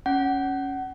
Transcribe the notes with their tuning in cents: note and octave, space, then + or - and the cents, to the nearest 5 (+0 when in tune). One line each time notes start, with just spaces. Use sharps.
C#4 +0 F#5 +20